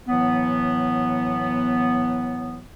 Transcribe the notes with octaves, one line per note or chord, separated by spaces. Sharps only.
A2 E3 F#3 B3